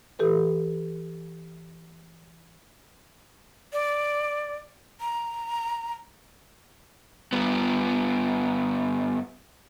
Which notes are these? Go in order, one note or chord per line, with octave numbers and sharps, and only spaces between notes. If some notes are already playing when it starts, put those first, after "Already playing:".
E3 G4 A4 B4
D5
A#5
G2 B3